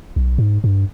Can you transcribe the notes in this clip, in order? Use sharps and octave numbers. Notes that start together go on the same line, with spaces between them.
B1
G#2
G2